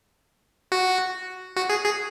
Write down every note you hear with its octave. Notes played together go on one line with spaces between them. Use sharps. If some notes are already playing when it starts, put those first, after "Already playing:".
F#4
F#4
G#4
G#4